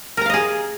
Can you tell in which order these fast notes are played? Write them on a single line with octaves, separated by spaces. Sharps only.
A#4 A#5 F5 D#5 G#4